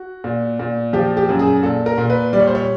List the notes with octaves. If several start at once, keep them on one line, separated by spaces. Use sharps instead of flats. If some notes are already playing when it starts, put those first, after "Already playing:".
Already playing: F#4
A#2
A#2
F3 G4
G4
F#2
G#4
A#2 A4
A#4
A#2
B4
G3 D5
C#5
C5
C#5